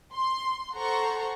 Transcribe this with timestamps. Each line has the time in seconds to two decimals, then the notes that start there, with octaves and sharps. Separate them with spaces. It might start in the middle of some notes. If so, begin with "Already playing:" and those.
0.14 C6
0.76 A4 C5 F#5 A#5 C6 C#6